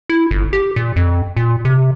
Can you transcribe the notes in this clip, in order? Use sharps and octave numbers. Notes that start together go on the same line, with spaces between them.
E4
G1
G4
A#2
F2
A#2
C3